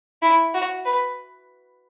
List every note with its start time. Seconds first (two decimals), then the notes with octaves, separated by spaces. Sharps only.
0.22 E4
0.54 F#4
0.85 B4